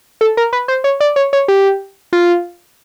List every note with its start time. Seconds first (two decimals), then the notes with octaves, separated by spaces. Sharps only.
0.21 A4
0.37 A#4
0.53 B4
0.68 C5
0.84 C#5
1.00 D5
1.16 C#5
1.33 C#5
1.48 G4
2.13 F4